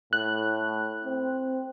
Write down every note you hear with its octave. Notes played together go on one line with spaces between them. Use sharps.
A2 F#6
C4